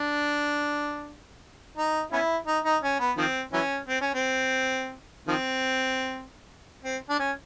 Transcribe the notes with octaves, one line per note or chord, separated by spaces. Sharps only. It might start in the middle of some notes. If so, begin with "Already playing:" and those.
Already playing: D4
D#4
B3 C#4 E4
D#4
D#4
C#4
B3
D#3 F3 C4
E3 F#3 C#4
C4
C#4
C4
D#3 F3 C4
C4
D4
C#4